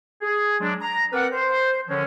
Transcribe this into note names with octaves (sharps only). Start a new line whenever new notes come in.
G#4
F#3 G#3 D4
A#5
C4 A#4 B4 D5 F#5
C5
D3 D#3 F3 G#3 C#4